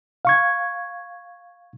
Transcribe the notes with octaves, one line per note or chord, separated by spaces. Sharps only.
F5 C#6 G#6